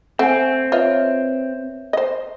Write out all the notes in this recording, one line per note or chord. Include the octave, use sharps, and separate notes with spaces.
A3 C4 F#5 G#5
F4 B4 C#5 D#5 E5
C5 D#5